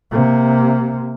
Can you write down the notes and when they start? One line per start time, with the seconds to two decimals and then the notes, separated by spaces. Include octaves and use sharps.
0.11 C3 A#3